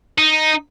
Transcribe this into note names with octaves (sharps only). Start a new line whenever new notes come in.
D#4